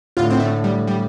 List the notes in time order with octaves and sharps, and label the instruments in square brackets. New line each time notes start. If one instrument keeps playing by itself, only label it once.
[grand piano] A2 D3 [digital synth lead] F4
[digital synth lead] C4
A3
G3
G3